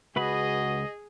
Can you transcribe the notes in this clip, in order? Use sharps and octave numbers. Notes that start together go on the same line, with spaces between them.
C#2 F#4 G#4 B4 D#5 B5